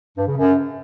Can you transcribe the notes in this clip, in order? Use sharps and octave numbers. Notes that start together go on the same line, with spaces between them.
G2
C#3
F#2